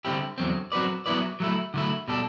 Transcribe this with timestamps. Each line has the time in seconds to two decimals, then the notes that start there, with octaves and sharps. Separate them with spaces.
0.05 D3 G3 C4 E4 G4
0.38 E2 D3 F#3 C4
0.72 F#3 C4 F#4 B4 D5
1.06 F#3 B3 E4 B4 D5
1.40 F#3 A3 E4
1.74 D3 F#3 A3 E4
2.08 B2 G3 D4 A4